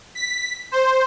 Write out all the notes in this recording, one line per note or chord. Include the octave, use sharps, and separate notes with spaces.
B6
C5